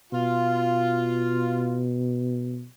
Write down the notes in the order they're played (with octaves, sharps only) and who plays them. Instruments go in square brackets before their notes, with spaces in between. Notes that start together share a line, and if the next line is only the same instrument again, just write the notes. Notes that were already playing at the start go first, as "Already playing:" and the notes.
[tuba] B2 [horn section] F4